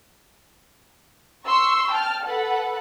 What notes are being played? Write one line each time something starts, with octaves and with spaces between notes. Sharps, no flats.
C6 C#6 E6
G5 A5 F6
A4 B4 F#5